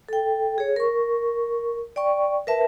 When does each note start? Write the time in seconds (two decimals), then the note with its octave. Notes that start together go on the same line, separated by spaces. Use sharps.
0.09 A4 G5
0.58 G#4 C#5
0.76 A#4 C#6
1.96 D5 G5 C#6
2.47 A#4 B4 E5 A5